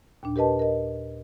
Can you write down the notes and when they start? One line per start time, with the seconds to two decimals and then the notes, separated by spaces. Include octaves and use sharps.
0.23 D#2 A#2 D4
0.36 G4 A#4 B4 D#5 A5
0.59 A#4 D#5